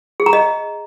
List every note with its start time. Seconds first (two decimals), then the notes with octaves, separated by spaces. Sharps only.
0.20 G#4
0.26 A#5
0.33 D#5